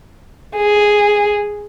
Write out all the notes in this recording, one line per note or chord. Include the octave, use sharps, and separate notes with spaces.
G#4